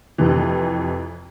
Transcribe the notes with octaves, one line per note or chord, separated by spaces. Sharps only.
F2 C3 E3